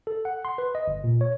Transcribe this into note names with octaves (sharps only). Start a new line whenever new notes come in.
A4
F#5
C6
B4
D#5
G1
A#2
C#5